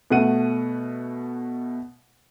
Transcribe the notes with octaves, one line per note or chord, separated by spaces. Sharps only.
B2 A3 F#5 D#7